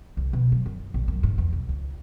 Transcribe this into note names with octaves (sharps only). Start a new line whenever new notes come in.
C2
B2
F#3
F#2
A#1
F#2
G#2
E2
B1
C#2